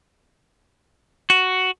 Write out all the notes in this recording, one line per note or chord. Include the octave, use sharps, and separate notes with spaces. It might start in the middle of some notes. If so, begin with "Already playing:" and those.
F#4